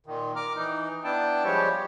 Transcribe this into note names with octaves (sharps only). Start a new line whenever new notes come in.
A#2 D#3
A#5 D6 F6
E3 D#4
B3 D4 E4 G5 A5
F3 G3 G#3 G4 C#5